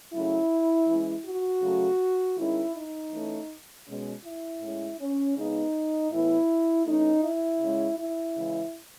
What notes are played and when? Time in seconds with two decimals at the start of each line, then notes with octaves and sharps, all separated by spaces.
0.12 C#3 F#3 A3 C#4 E4
0.87 E3 G#3 C#4
1.24 F#4
1.61 C#3 F#3 A3 C#4
2.37 D#3 G#3 C#4 E4
2.74 D#4
3.11 E3 A3 C#4
3.86 B2 G#3 C#4
4.23 E4
4.61 A2 G#3 C#4
4.99 C#4
5.36 C#3 G#3 B3 D#4
6.11 A2 E3 B3 E4
6.85 E3 A3 C#4 D#4
7.24 E4
7.60 C#3 G#3 C#4
7.98 E4
8.36 C#3 E3 G#3